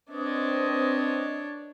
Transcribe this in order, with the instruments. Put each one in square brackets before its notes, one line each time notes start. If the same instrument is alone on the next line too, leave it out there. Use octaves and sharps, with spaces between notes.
[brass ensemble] C4 B4 D#5 [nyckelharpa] D4 C#5